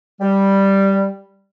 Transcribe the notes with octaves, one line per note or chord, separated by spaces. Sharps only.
G3